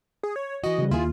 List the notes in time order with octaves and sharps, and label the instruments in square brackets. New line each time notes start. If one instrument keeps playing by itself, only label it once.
[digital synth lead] G#4
C#5
[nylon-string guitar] E3 F#4 [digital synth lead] D#5
[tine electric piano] C#3 G3
[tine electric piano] D#2 [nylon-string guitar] E4 G#4 [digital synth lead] F4